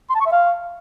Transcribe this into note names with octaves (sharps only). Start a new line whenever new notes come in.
C6
A5
C#6
E5
F5